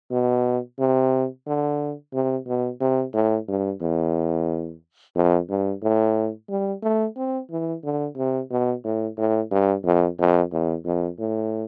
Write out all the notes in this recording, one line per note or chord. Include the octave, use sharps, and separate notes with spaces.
B2
C3
D3
C3
B2
C3
A2
G2
E2
F2
G2
A2
G3
A3
C4
E3
D3
C3
B2
A2
A2
G2
F2
F2
E2
F2
A2